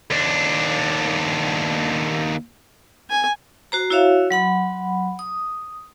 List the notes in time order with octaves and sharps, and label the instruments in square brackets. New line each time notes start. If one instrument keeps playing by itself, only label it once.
[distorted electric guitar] D#2 D4
[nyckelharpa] G#5
[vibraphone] F#4 C5 A#5
E4 F#4 C#5 E5 F5
F#3 F#5 B5
D#6